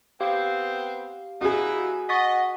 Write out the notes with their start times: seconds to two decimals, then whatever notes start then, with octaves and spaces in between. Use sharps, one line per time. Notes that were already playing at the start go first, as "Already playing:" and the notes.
0.21 B3 C4 G4 C5 F5
1.41 B3 D#4 E4 F#4 G#4
2.09 D#5 F#5 C#6 A6 B6